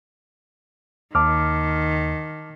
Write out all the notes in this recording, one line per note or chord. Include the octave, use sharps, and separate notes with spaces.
D#2 D#3 A5 D6 F6